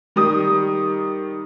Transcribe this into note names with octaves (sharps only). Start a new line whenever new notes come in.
D#3 G3 D#6